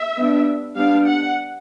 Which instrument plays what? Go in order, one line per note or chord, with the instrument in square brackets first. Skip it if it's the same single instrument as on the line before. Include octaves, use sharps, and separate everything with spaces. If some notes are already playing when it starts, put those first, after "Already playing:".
Already playing: [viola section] E5
G3 B3 D4
G3 B3 D4 F5
F#5